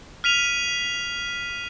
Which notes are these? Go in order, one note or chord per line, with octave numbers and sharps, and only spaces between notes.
F6 B6 D#7 F7